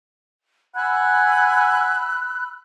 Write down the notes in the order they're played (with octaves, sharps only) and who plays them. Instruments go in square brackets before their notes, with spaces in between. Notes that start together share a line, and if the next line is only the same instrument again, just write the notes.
[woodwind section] F#5 G#5 [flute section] B5 E6 F#6